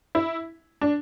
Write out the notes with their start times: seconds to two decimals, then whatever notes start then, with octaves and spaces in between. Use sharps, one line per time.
0.15 E4
0.81 D4